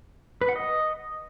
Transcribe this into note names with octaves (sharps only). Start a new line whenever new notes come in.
B4
F#5
D#5